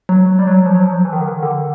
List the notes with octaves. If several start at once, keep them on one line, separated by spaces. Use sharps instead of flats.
F#3
G3
F#3
F3
F#3
F3
E3
D#3
D3
D#3
D3